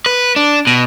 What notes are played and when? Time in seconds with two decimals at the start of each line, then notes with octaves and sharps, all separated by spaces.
0.06 B4
0.36 D4
0.67 B2